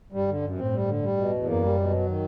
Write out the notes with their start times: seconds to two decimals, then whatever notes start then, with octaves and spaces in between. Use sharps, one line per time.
0.12 G2 G3
0.28 D3
0.42 F#2
0.57 A2 C4
0.72 G3
0.87 D3
1.01 G3
1.17 B2
1.32 E2
1.46 F#2 A#3
1.62 G3
1.76 B2
1.91 F#3
2.06 D#3